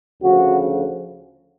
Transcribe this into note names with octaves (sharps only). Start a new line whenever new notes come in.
D2 C#3 F3 F#4